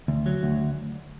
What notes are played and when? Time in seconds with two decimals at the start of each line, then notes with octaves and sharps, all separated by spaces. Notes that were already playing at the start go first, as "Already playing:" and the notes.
0.08 D2
0.26 F#3
0.43 D2